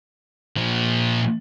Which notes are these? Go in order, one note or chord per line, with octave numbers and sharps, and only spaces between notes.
A#2 F3